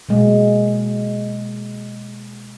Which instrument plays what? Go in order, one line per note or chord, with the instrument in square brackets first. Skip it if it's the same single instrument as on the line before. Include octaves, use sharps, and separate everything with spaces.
[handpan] B2 F#3 G#3 A#3